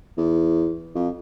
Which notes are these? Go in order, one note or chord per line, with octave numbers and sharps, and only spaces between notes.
E2
F2